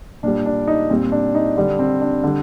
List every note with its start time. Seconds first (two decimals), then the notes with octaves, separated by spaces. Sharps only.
0.23 A#2 G3 D4
0.46 D4
0.67 D#4
0.90 A#2 G3 C4
1.12 D4
1.35 D#4
1.57 D3 G3 D4
1.79 C4
2.01 D4
2.24 D3 G3